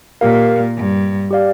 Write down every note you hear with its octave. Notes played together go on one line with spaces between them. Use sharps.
A#2 G4 A#4 F5
G2
G4 D5 F5